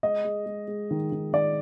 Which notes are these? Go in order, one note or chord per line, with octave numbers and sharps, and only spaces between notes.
G#3 D#5
G#3
G#3
G#3
D#3
D#3
D#3 D5